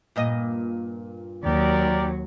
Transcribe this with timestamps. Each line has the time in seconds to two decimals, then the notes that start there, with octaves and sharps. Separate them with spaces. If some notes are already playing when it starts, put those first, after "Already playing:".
0.16 G2 A#2 D#5
1.44 D#2 F#3 G4 A#4 D5